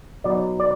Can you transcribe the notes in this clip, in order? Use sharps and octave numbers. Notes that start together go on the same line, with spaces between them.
B2 F#3 B3 D#4 D5
D5